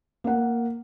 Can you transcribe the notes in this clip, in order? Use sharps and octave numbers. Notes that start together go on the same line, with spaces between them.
A#3 F#5